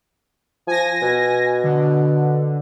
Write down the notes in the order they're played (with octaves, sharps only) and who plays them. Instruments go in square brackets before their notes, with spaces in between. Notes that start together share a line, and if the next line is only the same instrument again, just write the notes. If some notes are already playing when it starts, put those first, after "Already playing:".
[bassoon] F3 [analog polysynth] G#5 A#6
[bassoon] B2
[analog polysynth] D3